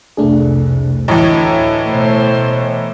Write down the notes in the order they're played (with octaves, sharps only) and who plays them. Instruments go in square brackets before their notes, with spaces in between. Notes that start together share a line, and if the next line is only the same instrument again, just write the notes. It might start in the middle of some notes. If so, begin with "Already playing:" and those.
[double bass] C2 F2 [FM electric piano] A3 D4 G#4
[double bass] D2 [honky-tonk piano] A2 E3 [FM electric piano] D#5 A#5
[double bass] B2 [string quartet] A3 C5